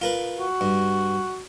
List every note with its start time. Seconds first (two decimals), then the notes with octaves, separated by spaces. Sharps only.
0.01 F4 A#4 B4
0.39 F#4
0.61 G2